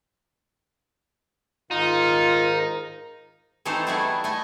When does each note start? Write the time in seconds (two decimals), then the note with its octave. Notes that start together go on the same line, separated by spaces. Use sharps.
1.71 G#2 D#3 D#4 F4
3.65 E3 A3 C4 D#4 A4 C5
3.87 G3 A3 B3 E4 F#4 G#4
4.24 A3 D#5 G#5